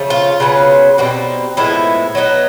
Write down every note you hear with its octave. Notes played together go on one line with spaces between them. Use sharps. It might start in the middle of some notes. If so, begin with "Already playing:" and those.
Already playing: C#3 F3 A3
F4
C#3 F#3 B3
B2 G3 C4 D#4 F#4
A2 F3 G#3 B3 E4
F#3 B3 D#4